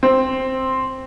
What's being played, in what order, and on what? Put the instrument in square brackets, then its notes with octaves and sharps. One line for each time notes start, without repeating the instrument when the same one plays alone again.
[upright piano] C4